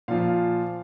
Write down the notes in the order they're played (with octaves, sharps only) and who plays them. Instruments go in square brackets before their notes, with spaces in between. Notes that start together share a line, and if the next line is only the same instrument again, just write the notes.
[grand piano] A#2 F3 F5